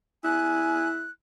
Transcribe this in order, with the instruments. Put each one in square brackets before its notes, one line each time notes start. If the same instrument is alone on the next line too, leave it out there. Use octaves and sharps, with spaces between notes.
[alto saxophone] E4 [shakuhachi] G#5 [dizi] F#6